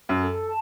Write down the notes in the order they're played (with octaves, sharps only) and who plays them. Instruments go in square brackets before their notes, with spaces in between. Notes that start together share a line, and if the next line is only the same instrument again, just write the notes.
[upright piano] F#2
[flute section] A4
A5